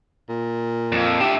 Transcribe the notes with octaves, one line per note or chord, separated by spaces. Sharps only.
A#2
F2
D4 G4 E5